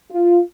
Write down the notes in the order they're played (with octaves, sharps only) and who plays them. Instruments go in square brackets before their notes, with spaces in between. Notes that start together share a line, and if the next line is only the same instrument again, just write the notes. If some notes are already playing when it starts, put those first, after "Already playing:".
[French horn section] F4